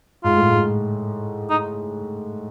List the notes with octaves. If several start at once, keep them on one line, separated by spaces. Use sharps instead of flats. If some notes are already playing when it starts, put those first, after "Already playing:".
G#2 F4
A2
G#2
D#4